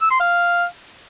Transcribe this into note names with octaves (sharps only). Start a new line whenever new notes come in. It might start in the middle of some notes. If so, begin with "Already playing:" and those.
E6
C6
F5